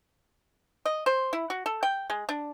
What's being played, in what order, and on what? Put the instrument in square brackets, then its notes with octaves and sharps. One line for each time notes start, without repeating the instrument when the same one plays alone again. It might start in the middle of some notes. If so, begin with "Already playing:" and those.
[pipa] D#5
C5
E4
F#4
A4
G5
G#3
D4